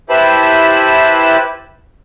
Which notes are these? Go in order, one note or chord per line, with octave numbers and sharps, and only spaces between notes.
E4 G4 B4 C5 A5 B5